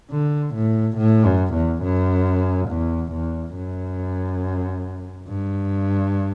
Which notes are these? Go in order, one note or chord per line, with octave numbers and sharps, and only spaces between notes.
D3
A2
A2
F#2
E2
F#2
E2
E2
F#2
G2